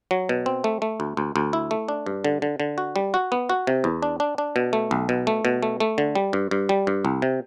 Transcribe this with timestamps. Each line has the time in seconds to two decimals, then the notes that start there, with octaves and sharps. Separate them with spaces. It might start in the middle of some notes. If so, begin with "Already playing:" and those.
0.11 F#3
0.29 B2
0.46 C4
0.64 A3
0.82 A3
1.00 D2
1.17 D2
1.36 D2
1.53 E4
1.71 A3
1.89 D4
2.06 G2
2.24 D3
2.42 D3
2.60 D3
2.78 F#4
2.96 G3
3.14 F#4
3.32 B3
3.49 F#4
3.67 C3
3.84 E2
4.02 D4
4.20 D4
4.38 D4
4.56 B2
4.73 A3
4.91 B1
5.09 B2
5.27 A3
5.45 B2
5.63 A3
5.80 A3
5.98 D3
6.15 G3
6.33 G2
6.51 G2
6.69 G3
6.87 G2
7.05 C2
7.22 C3